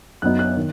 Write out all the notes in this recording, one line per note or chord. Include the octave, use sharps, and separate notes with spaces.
F#2 F#3 B3 D#4 F#6
F#6
D#3